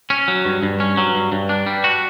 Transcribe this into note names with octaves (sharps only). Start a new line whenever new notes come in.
C#4
F#3
G2
G2
C#4
F#3
G2
G2
D4
G3
F#4